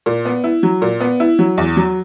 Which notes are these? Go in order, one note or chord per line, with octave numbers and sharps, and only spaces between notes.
A#2
B3
E4
F#3
A#2
B3
E4
F#3
E2
F#3